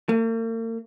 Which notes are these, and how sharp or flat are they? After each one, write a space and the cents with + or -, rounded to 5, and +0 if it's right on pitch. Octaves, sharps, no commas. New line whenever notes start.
A#3 -45